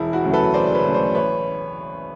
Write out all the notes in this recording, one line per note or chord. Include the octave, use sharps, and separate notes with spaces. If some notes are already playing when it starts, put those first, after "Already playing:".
Already playing: E1 E4
E4 F#4
D2 C#3 F#3
A4 B4
E1 C5 D5
B4 C#5
D2 C#3 F#3
C5 D5
A1 B4 C#5